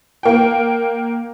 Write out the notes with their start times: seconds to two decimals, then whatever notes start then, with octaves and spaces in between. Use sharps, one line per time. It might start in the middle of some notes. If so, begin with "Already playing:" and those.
0.23 A#3 G5